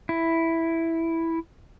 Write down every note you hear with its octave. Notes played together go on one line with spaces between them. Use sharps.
E4